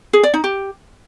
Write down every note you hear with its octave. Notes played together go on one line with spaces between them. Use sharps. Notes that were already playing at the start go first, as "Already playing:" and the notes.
G#4
D5
D#4
G4